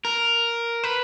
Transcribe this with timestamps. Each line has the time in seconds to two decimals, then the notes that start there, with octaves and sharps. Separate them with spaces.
0.05 A#4
0.84 B4